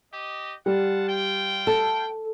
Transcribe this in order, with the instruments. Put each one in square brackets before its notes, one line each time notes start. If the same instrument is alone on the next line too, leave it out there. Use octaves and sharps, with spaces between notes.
[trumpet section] G4 D#5
[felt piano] G3 [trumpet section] F4 F#5 A5
[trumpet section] F4 G5
[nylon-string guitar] A4